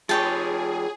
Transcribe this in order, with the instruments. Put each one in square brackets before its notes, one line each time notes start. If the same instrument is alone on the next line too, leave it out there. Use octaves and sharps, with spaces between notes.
[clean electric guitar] F3 G4 [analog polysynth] G#4 [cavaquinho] C#5 G5 A5